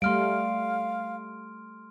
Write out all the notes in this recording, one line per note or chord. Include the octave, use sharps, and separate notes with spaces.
G3 A3 F5 C6 F6 D7